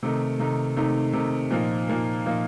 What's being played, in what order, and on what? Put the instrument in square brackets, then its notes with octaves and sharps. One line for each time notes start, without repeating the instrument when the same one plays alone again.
[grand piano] C3 D#3 A3 D#4
C3 D#3 A3 D#4
C3 D#3 A3 D#4
C3 D#3 A3 D#4
A#2 F3 A#3 D#4
A#2 F3 A#3 D#4
A#2 F3 A#3 D#4